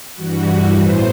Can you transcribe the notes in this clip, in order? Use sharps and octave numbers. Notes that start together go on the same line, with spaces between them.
G2 E3 G3 F#4
A2 E3 B3 C5